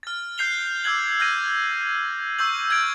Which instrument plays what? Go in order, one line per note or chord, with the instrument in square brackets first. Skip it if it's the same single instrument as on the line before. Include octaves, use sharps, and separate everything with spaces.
[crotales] F6 A6
F#6 G6 C7 F7 G7
D6 E6 F#6 G#6 F#7
F6 G6 A#6 D#7
C#6 E6 G6 F#7
F6 G#6 A6 D7 F#7